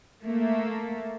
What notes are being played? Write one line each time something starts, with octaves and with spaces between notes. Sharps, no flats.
A3 A#3